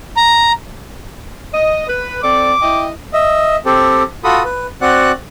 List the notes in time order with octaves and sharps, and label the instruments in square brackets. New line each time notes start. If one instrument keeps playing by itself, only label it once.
[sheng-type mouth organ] A#5
[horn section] D#5
B4
[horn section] C4 A4 D5 [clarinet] D6
[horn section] E4 D#5 G5
[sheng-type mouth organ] D#5 E5
C4 G4 A4
F4 F#4 A4 B5 D#6
B4
C4 F#4 D5 F#5 F#6